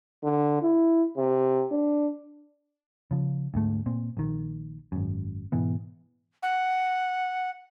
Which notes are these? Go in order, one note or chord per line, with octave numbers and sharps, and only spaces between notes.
D3
E4
C3
D4
C#3 F3
D2 G#2 A3
A#2 C4
A#1 D#3
G#1 F#2
G#2 B2 E3 B3
F#5